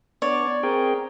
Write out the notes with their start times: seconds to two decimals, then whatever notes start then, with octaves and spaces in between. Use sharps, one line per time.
0.22 B3 D4 C#5 D5
0.63 C4 G#4 A#4 G5